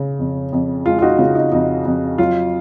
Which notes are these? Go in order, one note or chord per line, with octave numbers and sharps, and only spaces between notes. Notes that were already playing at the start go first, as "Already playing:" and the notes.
Already playing: C#3
F2
F2
G#3 F4
F4
D#4 F#4
C#3 F4
D#4
F2 D#4
F2
F#3 F4